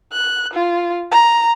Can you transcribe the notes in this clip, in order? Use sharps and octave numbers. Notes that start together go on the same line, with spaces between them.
F#6
F4
A#5